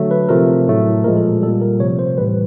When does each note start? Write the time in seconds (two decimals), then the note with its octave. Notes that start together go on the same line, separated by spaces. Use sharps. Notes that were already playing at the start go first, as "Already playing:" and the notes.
Already playing: D3 F#3 A3
0.11 B4
0.29 C3 F3 A3 A#4
0.68 A2 F#3 A3
1.04 A#2 F3 G#3 A#4
1.17 A4
1.42 G3 A4
1.47 A#2
1.61 A#4
1.80 C3 F3 A3 C#5
1.99 C5
2.17 A2 E3 G3 B4